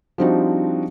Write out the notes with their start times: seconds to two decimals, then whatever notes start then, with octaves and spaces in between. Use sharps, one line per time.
0.18 F3 G3 C4 D4 D#4 F#4